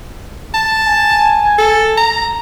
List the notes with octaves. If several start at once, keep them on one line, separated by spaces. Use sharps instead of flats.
A5
G#5
A4
A#5